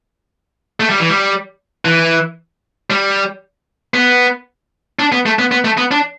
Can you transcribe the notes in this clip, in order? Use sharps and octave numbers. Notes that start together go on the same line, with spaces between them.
A3
G3
E3
G3
E3
G3
B3
D4
B3
A3
B3
B3
A3
B3
D4